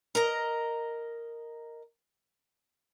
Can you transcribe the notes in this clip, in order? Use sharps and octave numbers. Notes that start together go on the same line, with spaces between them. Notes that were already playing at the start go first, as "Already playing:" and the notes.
A#4 D#5 A#5